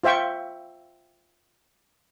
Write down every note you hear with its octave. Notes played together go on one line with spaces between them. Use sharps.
F4 C5 E5 G5 C#6